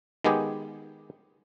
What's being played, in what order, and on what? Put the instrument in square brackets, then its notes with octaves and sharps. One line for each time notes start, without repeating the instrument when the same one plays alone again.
[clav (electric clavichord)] D#3 G#3 B3 G4 G#4